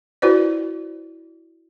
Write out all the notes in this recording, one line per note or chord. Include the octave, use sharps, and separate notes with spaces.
E4 F#4 B4 C5 D5